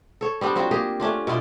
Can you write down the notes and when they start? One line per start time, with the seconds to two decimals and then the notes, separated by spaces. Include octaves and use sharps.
0.21 A4 C#5
0.41 G3 B3 C4 D4
0.56 F#3 C4 F4 F#4
0.71 A#3 G4 G#4
1.00 A3 C#4 D4 F4
1.27 B2 E4 F4 D5